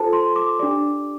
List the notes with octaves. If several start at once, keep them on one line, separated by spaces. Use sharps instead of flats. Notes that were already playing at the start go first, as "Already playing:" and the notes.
Already playing: F4 A4 C5 A5
C6
D6
D4 G4 D5 D6